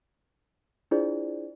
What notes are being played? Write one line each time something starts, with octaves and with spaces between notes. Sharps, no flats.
D4 E4 F4 G#4 C5 D5